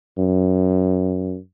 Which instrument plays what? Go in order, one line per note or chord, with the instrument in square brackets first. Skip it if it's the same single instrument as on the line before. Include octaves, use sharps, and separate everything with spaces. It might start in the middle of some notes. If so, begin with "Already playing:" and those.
[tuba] F#2